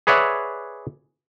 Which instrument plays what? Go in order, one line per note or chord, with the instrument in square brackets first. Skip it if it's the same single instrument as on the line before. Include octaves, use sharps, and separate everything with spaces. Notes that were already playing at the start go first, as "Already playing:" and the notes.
[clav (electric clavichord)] G#4 B4 C#5 D5 E5 F#5